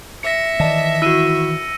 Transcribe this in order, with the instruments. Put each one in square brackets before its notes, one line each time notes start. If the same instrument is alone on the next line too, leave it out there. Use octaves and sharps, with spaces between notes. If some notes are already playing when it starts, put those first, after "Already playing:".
[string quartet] E5 [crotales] A#6 C#7
[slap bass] D#3 E3 [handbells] D5 D#5 A5
[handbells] E4 F#4 [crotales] E6 D#7